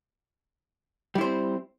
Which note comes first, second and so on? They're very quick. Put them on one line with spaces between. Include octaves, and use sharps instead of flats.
G3 E4 C5 C4